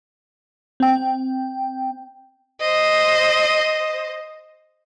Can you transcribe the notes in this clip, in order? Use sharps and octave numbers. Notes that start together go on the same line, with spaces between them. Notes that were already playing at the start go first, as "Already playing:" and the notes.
C4 G5
C5 D#5